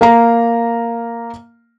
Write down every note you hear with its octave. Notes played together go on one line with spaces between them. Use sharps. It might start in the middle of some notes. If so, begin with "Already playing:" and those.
A#3 F5 A#5